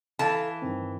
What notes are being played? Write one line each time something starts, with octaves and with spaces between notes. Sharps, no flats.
E3 A4 F5 A5
G2 D#3 C4